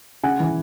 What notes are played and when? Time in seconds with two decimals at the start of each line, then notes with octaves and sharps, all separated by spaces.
0.23 C#3 F#5 G#5
0.40 E3